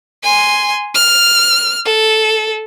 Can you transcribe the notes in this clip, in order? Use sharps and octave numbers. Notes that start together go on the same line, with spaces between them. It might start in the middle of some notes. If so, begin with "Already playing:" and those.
G#5 C6
F6
A4